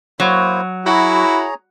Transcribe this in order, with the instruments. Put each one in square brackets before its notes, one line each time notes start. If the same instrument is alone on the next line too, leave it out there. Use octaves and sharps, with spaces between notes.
[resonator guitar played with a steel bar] F#3 [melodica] A#3 E4 C5
[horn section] E4 F#4 [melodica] G#4 C#5 A#5 [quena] B5